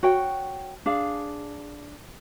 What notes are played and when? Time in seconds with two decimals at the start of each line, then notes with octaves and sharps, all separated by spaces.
0.03 F#4 C#5 G5
0.86 D4 G#4 F5